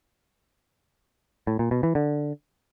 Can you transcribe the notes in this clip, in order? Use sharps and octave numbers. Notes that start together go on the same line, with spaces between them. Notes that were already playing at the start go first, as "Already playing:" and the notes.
A2
A#2
B2
E3
D3